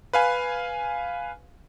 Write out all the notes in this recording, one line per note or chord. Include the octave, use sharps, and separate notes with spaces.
B4 F5 G#5